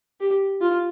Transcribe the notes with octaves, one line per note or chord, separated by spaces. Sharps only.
G4
F4